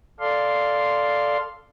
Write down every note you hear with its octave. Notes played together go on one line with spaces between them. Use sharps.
A4 D5 F5 C6